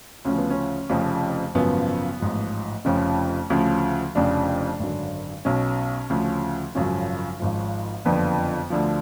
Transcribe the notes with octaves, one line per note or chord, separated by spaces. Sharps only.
D2 C#3 F3 C#4
B3
C#4
F1 F2 C#3 F3
G#1 F#2 C#3 F3 B3
A1 G#2 F3
F1 F2 C#3 F3 C#4
D2 C#3 F3
F1 F2 C#3 F3 D4
G#1 F#2 D3
B1 B2 C#4
D2 C#3 F3
G#1 F#2 C#3 F3 C#4
G#1 G#2 F3
F#1 F2 D3 F3 B3
D2 D3 F3